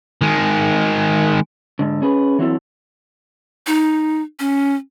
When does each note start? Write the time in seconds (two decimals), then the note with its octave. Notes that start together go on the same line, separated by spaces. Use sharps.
0.21 D#3 G#3
1.79 G#2 D3
2.02 C#4 G#4 B4
2.39 E3 F#3 C4 E4 A4
3.67 D#4
4.40 C#4